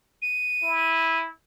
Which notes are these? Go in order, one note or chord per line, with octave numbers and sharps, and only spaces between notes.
D#7
E4